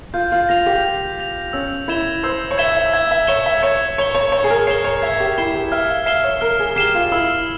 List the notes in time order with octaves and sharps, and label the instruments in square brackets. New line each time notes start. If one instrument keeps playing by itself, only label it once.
[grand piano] F4 [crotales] G6
[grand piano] F4
[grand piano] F4 [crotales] A#6 F7
[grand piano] G4
[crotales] G6
A#6 F7
[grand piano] C#4 [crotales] E6
[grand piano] E4 [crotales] G#6 E7 G7
[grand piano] C5 [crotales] E6
[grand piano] C#5
[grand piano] E5 [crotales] G#6 E7 G7
[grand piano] E5
[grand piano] E5 [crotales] G#6
[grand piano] E5
[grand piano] C#5 [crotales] E7 G7
[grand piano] E5
[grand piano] C#5 [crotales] G#6
[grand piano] C#5 [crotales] E7 G7
[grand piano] C#5
[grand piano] C#5 [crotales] G#6
[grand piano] G#4
A#4
[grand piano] C#5 [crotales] C7 E7 G7
[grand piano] C#5
[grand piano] E5 [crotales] G#6
[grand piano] G4
[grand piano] E4 [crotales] C7 E7 G7
[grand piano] G4
[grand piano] E5 [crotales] F6
[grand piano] F5
[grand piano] E5 [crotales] C7 E7 G7
[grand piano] C#5
[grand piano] A#4 [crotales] F6
[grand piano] G#4
[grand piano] G4 [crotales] C7 E7 G7
[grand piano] F4
[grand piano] E4 [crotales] E6